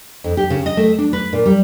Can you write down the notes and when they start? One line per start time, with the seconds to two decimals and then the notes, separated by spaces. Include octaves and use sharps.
0.24 F2
0.37 G4
0.50 C#3
0.66 D#5
0.77 A3
0.98 D4
1.13 B4
1.33 A#2
1.46 G3